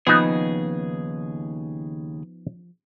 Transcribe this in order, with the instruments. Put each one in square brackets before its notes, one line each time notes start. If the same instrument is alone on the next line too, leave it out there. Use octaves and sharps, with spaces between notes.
[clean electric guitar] D#2 C#3 G#4 [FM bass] F3 [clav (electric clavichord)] B3 D#4